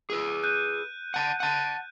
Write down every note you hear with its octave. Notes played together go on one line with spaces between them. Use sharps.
G#4 B4
F#6 G6 D#7
F#5 A5
F#5 A5